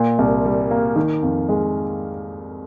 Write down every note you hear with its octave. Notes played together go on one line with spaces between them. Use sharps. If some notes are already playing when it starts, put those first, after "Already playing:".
Already playing: A#2
C2
G3
A#3
D#3
F2
G#3